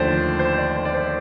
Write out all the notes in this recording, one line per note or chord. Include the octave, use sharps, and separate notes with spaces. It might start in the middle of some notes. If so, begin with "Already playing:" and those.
Already playing: D#2 D3 F3 A3 C5 D5
C5
D5
C5
D5
C5